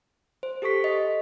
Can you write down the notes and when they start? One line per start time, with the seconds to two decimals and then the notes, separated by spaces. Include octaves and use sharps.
0.43 C5
0.62 G4 A4 C5 C#6 B6
0.84 D#5